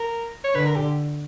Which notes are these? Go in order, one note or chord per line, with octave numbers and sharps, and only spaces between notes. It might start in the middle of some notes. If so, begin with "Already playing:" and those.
Already playing: A#4
C#5
D3 B4
A#4
G4